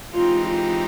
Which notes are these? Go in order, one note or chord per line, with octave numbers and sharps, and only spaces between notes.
E3 G#3 C4 D#4 F4 G4
F4